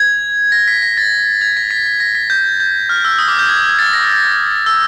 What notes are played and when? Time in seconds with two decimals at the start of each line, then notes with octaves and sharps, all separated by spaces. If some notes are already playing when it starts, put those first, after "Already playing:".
Already playing: G#6
0.52 A#6
0.68 B6
0.82 A#6
0.97 A6
1.41 G#6
1.57 A#6
1.71 B6
1.86 B6
2.00 A#6
2.15 B6
2.30 G6
2.60 G6
2.89 F6
3.04 E6
3.19 D#6
3.28 D6
3.39 G6
3.49 G#6
3.58 G6
3.68 G#6
3.79 A6
3.93 A#6
4.66 E6